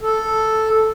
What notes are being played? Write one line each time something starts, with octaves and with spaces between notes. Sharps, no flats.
A4